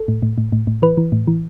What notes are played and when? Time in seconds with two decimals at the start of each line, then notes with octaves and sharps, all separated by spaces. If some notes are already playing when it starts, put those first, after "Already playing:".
Already playing: A4
0.08 A2
0.22 A2
0.38 A2
0.52 A2
0.67 A2
0.82 E3 B4
0.97 E3
1.12 A2
1.27 E3